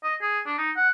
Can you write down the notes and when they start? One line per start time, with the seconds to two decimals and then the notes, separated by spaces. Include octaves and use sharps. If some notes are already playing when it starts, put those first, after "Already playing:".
0.04 D#5
0.22 G#4
0.46 D4
0.58 D#4
0.76 F#5